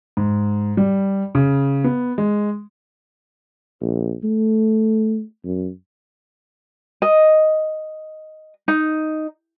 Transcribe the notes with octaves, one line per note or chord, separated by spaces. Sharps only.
G#2
G3
C#3
B3
G#3
A#1
A3
F#2
D#5
D#4